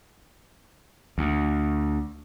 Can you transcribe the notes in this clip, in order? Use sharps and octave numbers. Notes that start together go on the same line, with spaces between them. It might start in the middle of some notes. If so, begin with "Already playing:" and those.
D2